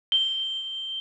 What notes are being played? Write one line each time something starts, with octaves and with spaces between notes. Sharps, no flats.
G7